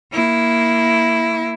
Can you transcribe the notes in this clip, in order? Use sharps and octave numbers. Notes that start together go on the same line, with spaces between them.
A#3 E4